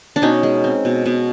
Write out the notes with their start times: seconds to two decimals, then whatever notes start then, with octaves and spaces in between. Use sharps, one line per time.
0.16 D4
0.22 B2 C#4 D#4
0.43 G#3
0.64 C4
0.85 B2
1.06 B2